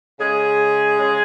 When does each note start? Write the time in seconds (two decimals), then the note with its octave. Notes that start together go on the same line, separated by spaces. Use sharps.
0.20 C#3 G#3 G#4
0.99 C#3 G#3